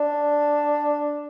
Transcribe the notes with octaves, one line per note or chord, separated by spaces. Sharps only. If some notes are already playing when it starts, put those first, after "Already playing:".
Already playing: D4